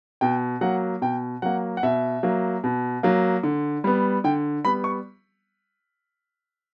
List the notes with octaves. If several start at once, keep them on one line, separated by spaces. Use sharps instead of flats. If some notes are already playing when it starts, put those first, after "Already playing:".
B2 G5
F#3 A#3 F#5
B2 G5
F#3 A#3 F#5
F#5
B2 E5
F#3 A#3
B2
F#3 A#3
D3
G3 B3
D3 G5
G3 B3 B5
C#6